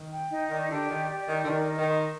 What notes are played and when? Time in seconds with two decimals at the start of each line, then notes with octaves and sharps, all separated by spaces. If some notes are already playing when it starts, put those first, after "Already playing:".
Already playing: D#3
0.11 G5
0.31 D#4
0.50 D#3 D5
0.70 D3 G4
0.89 D#3 D5
1.09 G4
1.29 D#3 D5
1.44 D3
1.48 D#3 A#4
1.69 D#5
1.78 D#3
1.88 C6